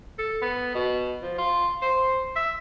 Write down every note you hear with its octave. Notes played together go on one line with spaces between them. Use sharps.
A4
B3
B2
F3
F4
C5
E5